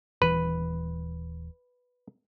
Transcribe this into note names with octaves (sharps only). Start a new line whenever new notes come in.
D#1 E3 B4